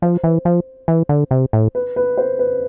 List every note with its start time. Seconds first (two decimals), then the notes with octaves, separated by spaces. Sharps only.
0.02 F3 C5
0.24 E3
0.45 F3
0.88 E3
1.09 D3
1.31 C3
1.53 A2
1.75 B4
1.96 B4
2.17 C5
2.39 B4